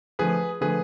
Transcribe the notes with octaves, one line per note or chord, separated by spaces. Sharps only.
D3 F3 A3 G#4 B4
D3 F3 A3 G#4 B4